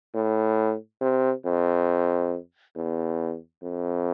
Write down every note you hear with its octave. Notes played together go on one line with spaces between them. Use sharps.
A2
C3
F2
E2
F2